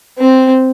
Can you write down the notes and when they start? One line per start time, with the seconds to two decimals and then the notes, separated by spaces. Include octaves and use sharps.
0.18 C4